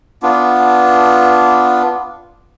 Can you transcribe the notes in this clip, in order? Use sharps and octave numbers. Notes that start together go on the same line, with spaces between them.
B3 D4 F4